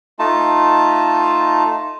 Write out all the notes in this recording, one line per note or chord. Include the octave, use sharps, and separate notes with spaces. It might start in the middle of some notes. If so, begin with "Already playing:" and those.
A3 D#4 F4 A5